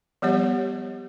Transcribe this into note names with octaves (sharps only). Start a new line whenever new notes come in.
F3 G3 B3 G4 C#5